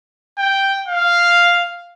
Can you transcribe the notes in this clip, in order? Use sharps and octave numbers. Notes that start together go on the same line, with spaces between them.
G5
F5